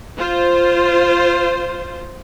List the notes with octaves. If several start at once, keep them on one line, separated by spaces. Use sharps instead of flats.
F4 C5